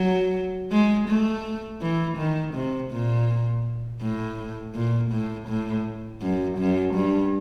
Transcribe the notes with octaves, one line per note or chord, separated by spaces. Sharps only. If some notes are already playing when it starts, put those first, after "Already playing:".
Already playing: F#3
G#3
A3
E3
D#3
C3
A#2
A2
A#2
A2
A2
F#2
F#2
G2